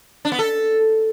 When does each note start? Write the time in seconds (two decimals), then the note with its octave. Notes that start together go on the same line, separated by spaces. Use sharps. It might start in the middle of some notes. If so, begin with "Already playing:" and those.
0.25 D4
0.32 B3
0.39 A4